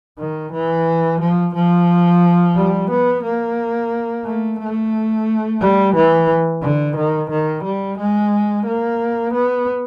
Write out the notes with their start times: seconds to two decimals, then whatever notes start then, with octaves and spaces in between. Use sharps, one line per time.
0.19 D#3
0.52 E3
1.21 F3
1.55 F3
2.56 G3
2.90 B3
3.24 A#3
4.25 A3
4.59 A3
5.61 G3
5.95 E3
6.63 D3
6.96 D#3
7.30 D#3
7.64 G3
7.98 G#3
8.66 A#3
9.33 B3